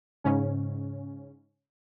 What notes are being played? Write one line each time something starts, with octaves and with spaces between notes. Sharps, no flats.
G#2 C#3 C#4